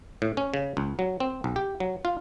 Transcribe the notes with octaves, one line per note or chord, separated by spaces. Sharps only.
A2
C#4
C#3
C#2
F#3
C4
B1
G4
F#3
F4